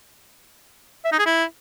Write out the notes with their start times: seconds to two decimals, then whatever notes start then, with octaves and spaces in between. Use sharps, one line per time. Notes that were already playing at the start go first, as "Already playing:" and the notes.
1.05 E5
1.12 D#4
1.19 G#4
1.26 E4